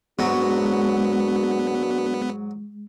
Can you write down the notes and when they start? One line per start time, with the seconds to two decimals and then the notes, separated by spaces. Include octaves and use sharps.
0.19 G#2 F#3 G#3 A#3 B3 D4 F#4